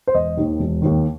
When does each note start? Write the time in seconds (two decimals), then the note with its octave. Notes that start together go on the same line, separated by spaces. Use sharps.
0.07 C5
0.14 E1 D#5
0.37 D#2 D#3
0.60 E1
0.82 D#2 D#3